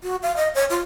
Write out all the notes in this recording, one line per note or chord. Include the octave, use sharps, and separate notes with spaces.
F#4
F5
D#5
C#5
F4